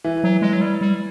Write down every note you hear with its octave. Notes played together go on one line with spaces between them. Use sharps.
E3
F#3
G#3
F#3
G3
G3